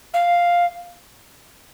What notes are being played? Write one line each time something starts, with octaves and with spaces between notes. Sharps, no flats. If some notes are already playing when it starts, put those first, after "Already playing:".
F5